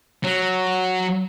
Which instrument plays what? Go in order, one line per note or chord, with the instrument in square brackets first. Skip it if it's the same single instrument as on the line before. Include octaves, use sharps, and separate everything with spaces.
[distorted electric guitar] F#3